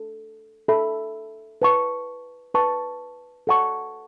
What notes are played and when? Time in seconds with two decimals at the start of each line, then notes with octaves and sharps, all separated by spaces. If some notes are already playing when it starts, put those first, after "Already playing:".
Already playing: A4
0.68 A4 E5 B5
1.62 B4 A5 C#6
2.54 B4 A5 C#6
3.47 A4 F#5 A5 C#6